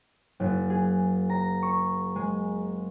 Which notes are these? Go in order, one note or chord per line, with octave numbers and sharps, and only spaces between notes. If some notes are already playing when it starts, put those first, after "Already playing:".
F#1
G#4
A#5
C#6
G#3